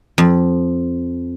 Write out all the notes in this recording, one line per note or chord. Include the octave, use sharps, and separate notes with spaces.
F2